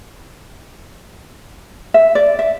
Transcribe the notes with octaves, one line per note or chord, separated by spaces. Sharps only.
E5
D5
E5